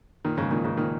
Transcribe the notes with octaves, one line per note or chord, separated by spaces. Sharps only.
A#2 D#3
G#2 C#3
A#2 D#3
G#2 C#3
A#2 D#3